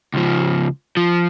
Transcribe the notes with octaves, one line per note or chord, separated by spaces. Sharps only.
C#2 F3
F3